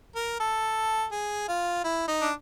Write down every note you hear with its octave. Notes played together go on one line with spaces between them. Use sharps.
A#4
A4
G#4
F4
E4
D#4
D4